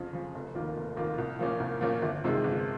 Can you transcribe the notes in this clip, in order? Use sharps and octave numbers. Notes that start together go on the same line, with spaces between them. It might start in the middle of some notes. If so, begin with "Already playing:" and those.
Already playing: F2 C#3 F3
C#3 F3
F1
D#2 D#3 A#3 F4
F1
D#2 D#3 A#3 F4
C2
A#2 F3 A#3 C#4
C2
A#2 F3 A#3 C#4
G1
F2 C3 D#3 G#3
G1